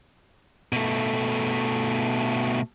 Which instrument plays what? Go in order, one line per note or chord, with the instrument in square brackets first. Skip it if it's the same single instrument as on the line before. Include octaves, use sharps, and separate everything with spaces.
[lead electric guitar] B2 A3